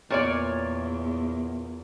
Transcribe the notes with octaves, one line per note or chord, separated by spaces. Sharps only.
E2 A#2 C#5 D5